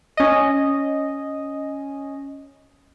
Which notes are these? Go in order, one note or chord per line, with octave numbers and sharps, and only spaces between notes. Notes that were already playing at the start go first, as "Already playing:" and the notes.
C#4 D#5